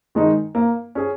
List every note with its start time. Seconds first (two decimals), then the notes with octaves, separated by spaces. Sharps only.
0.15 D#3 G#3 D#4
0.55 A#3
0.95 C#4 G#4